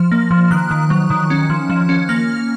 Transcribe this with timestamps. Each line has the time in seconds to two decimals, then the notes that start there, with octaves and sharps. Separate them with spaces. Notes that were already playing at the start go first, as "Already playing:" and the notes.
Already playing: F3 F6
0.11 A#3
0.31 F3
0.51 D#3 F#6
0.71 D#3
0.90 F#3
1.10 D#3
1.30 C#4
1.50 F3
1.69 F3
1.89 C#4
2.09 A#3 F6